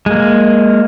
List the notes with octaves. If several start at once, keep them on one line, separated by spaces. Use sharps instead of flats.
G#3 A#3